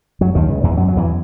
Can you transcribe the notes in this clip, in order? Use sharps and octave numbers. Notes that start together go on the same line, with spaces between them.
F#2 F#3
D#2 D#3
C#2 C#3
E2 E3
F#2 F#3
F#3
E2 E3